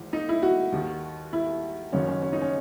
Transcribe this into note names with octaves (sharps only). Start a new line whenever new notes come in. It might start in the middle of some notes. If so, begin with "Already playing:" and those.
Already playing: G#1 G#2 E3
D#4
E4
F#4
D#2 D#3
E4
F#1 F#2 D#3 C#4
C#4
C#4
D#4
C#4